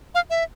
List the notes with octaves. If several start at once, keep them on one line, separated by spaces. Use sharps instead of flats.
F5
E5